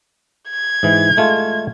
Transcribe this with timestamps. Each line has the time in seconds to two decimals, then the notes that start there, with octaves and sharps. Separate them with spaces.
0.50 G#6
0.83 G#2 E3
1.17 G#3 A3 F4